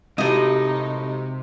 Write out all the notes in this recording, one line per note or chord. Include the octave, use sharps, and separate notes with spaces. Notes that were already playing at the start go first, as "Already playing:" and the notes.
A2 C3 G#3 D#4 F#4 G4 D#5